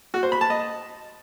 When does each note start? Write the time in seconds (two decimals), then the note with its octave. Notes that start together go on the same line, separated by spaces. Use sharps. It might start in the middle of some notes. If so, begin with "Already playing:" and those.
0.14 F#4
0.23 C5
0.32 B5
0.41 A5
0.50 D#5